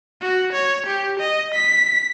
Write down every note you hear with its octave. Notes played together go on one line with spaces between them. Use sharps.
F#4
C#5
G4
D#5
B6